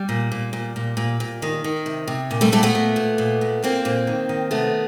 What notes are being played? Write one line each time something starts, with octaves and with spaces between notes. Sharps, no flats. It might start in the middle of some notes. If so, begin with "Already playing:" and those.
Already playing: G3
A#2
A#2
A#2
A#2
A#2
A#2
D#3
D#3
C3
C3
A#2
G3 A3
A#2 G3 A3
A3 B3
A#2
A#2
A#2
A#2
A#2 A#3 C4
A#2
D#3
D#3
C3 A3 B3